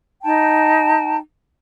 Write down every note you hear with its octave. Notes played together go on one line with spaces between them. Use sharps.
D#4 G5 A5